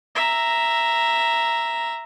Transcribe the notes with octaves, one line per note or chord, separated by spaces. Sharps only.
E5 A#5